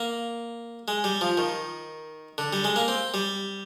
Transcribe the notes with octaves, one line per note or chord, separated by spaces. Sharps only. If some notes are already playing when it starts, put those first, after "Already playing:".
Already playing: A#3
G#3
G3
F3
D#3
D3
G3
G#3
A#3
C4
G3